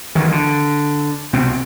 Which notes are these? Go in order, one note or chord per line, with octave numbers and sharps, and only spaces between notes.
F#1 D#3 E3
D3
C2 B2 C4